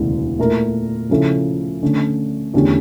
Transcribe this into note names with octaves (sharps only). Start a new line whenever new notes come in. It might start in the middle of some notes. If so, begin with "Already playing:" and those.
Already playing: E1 D2 C#3 E3
A#2 A3 E4 A#4
C#3 F3 C#4 E4 A4
D3 A3 C#4
E2 D3 A3 C#4 G4